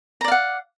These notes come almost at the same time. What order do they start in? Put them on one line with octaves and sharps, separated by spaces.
A#5 D5 F5 F#5